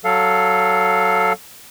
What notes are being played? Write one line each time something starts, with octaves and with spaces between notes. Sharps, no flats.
F#3 A4 F5